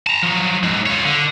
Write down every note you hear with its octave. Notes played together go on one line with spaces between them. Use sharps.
A5 A#5
F3 F#3
C#2 G#2
F4 C#5
D3